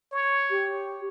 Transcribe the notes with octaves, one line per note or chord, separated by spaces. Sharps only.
C#5
G4